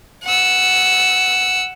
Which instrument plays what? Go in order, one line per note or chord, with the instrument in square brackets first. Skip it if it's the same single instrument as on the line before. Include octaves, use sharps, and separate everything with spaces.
[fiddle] F#5 E6